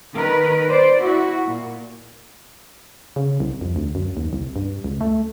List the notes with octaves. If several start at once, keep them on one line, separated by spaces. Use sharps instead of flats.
D#3 A#4 B4
C5 D5
E4 F#4
A#2
C#3
C2
F2
D2
F#2
D#2
C2
G2
C#2
A3